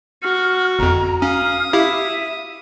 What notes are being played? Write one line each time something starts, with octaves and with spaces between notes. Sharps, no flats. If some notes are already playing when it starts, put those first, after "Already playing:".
F#4 F6
G1 F2 A#5
C#4 F5 D#6
E4 G4 E5 F5